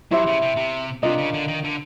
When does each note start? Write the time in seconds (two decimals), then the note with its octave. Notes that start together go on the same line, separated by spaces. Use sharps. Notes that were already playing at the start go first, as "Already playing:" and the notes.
0.11 F#3 E4 G4 C5 E5
0.26 C#3
0.42 C3
0.56 C3
1.03 C3 D4 F4 A#4 D#5
1.18 C#3
1.34 D3
1.48 D#3
1.64 D3